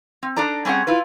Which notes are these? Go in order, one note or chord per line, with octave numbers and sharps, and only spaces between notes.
C4
D4 D#4 A4 D5 A#5
G3 C4 C#4 G#4 F#5
E4 F4 B4